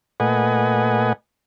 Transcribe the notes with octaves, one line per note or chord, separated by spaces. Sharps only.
A#2 A3 B4 D#5 F#5 G#5